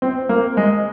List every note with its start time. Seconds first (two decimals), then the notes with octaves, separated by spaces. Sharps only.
0.02 C4
0.29 A#3
0.57 G#3